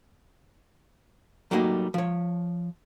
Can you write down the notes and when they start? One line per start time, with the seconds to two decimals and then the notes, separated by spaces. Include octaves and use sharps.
1.51 F#3 G3 A3 A#3 D#4
1.94 F3 C#5